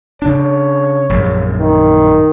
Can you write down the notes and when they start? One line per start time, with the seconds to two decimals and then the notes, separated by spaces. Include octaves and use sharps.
0.22 C#3 D4 C#5
1.09 A#1 F#2
1.59 D#3